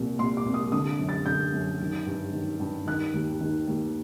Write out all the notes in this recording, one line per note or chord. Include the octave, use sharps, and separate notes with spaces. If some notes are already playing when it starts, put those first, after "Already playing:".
Already playing: C2 A#2
A#2 C6
D6
C2
D#6
D3 D#6
F#2
A6
D3 G6
F#2
D#3
G2
D#3
G2
D#3 F#6
D#2
D#3
D#2